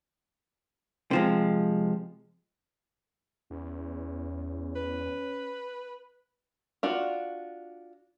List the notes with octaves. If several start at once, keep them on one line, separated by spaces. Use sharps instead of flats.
C3 F3 G#3
E2 C#4
B4
D4 F4 F#4